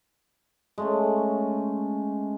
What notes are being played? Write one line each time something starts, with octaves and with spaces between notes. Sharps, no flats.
G#3 A3 C#4